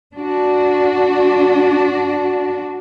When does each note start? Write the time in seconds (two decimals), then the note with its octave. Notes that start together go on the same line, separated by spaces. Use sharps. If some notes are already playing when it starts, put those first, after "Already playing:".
0.16 D4 F#4